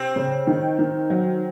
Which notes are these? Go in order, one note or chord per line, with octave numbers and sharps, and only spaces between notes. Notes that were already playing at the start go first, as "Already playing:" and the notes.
Already playing: C3 C4
C#3
D#3
D#3
F#3